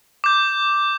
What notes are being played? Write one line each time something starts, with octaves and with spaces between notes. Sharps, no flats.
D6 G6